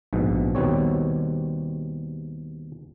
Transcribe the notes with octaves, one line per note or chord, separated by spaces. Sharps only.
A#1 G#2 B2
D#2 B2 G3 C4 C#5